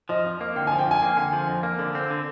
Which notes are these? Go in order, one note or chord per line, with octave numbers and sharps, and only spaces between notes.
F3 D#5
F2
A#3
D3 G5
G#5
F3
G5
F2 G#5
A#3
D3
F3
F2
A#3
D3
C4
D3